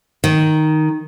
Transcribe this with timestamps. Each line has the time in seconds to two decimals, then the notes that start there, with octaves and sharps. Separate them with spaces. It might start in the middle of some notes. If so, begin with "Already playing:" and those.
0.24 D#3